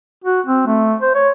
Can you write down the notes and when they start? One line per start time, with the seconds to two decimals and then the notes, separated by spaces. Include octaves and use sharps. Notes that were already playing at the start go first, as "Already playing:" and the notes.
0.24 F#4
0.47 C4
0.67 A3
1.01 C5
1.15 C#5